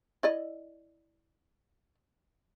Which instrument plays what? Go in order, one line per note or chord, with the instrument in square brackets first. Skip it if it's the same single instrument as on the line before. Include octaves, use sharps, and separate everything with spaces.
[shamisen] E4 D5 D#5